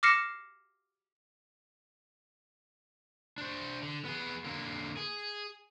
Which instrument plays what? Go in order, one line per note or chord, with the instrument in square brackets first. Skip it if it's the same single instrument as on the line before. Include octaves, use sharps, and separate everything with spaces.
[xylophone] D6 F6 A#6 C7 C#7 E7
[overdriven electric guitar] D4 C5
D3
B3 G#4
D3 A#3
G#4